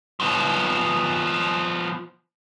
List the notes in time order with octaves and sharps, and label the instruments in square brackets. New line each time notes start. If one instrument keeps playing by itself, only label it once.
[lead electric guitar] F3 B3